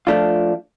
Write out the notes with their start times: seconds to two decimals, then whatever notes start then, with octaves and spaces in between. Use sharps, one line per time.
0.07 F3 A3 D4 F4